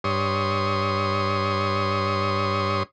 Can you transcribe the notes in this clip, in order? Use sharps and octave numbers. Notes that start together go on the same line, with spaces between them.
G2 C#5 C6 D#6